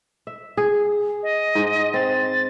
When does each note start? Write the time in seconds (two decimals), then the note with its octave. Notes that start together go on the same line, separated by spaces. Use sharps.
0.27 E5
0.57 G#4
1.23 D#5
1.55 G#2
1.94 C4 A6